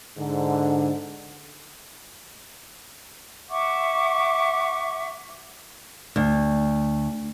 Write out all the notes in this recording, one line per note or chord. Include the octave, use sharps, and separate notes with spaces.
G#2 D3
E5 F#5 C#6 D6
D2